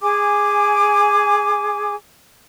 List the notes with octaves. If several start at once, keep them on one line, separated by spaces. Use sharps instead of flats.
G#4 G#5 D6